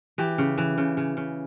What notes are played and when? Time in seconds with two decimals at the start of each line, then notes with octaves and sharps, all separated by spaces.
0.18 E3 G4
0.38 C#3
0.58 E3
0.78 C#3
0.97 C#3
1.17 C#3